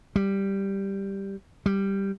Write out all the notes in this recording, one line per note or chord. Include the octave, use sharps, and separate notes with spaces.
G3
G3